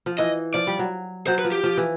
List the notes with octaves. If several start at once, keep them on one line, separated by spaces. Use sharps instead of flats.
F3
E3 D#5
F3 D5
G3
F#3
F#3 C5
B4
F3
G4
F3
E3